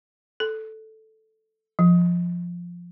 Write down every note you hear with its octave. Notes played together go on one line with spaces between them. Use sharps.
A4
F3